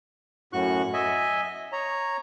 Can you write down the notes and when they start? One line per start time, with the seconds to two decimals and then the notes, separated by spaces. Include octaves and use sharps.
0.53 F#2 A2 F#4 C#6 F#6
0.93 D#5 E5 G#5
1.72 C#5 A#5